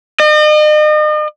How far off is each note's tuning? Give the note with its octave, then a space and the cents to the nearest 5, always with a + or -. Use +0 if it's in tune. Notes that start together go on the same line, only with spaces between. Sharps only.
D#5 -40